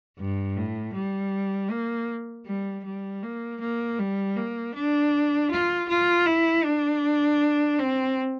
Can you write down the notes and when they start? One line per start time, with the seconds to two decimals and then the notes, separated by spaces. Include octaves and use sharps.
0.18 G2
0.56 A2
0.94 G3
1.71 A#3
2.46 G3
2.84 G3
3.23 A#3
3.61 A#3
3.99 G3
4.36 A#3
4.75 D4
5.51 F4
5.89 F4
6.26 E4
6.64 D4
7.79 C4